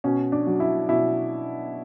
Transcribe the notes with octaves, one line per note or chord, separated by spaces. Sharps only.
B2 C#4
D4
F#3
E4
B2 E4